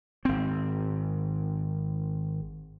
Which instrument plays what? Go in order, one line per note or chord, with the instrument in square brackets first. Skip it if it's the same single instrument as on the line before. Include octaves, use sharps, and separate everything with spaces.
[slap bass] G#1 C4